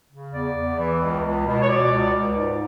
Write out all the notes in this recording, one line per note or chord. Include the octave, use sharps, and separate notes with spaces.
C#3
E2 D5
E2
E3
C#2
C#2
B2
C#5
B2 D5
C#2
C#2
G#2